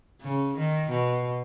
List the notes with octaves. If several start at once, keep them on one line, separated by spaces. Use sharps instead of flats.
C#3
D#3
B2